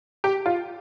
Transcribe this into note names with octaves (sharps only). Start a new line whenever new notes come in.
G4
F4